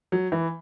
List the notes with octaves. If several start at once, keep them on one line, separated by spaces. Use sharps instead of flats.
F#3
E3